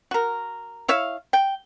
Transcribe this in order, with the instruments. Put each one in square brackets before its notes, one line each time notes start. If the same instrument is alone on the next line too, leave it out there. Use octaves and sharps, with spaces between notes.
[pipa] F#4 A#4
E4 C#5 E5 F5
G5